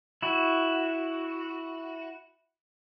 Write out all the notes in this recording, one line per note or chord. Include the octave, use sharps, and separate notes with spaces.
E4 F#4